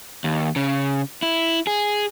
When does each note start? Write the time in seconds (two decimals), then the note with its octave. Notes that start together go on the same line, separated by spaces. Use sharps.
0.24 D#2
0.56 C#3
1.22 E4
1.67 G#4